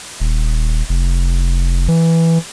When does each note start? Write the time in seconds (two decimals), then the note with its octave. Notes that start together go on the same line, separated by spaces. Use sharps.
0.20 D#1
0.89 F1
1.88 E3